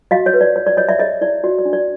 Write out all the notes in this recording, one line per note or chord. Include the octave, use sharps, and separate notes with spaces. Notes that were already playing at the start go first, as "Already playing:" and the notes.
F#4 D#5 F5
C#5 D#5
B4
D5
C#5
D5
G4 C#5 D#5
D5 E5
G#4 C#5 D#5
E4 D5
F#4 D5
D5
D4
D5